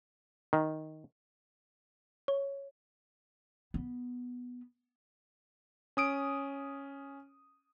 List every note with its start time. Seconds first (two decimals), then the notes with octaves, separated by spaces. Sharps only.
0.53 D#3
2.28 C#5
3.74 B3
5.97 C#4 D#6 D7